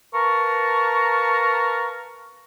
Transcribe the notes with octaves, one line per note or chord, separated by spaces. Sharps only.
A#4 B4 F5 A5 A#5 C#6